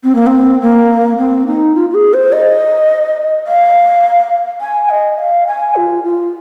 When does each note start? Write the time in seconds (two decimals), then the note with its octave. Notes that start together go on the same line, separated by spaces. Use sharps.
0.04 C4
0.15 A#3
0.26 C4
0.61 A#3
1.18 C4
1.47 D#4
1.75 F4
1.90 F4
1.94 G#4
2.13 C5
2.32 D#5
3.47 F5
4.61 G#5
4.90 D#5
5.18 F5
5.47 G#5
5.75 F4
6.04 F4